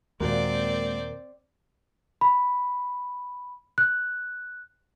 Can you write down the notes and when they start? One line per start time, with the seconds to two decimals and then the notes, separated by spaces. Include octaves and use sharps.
0.20 D#2 A#2 G#3 A#3 C4 F#4 A#4 D5
2.21 B5
3.78 F#6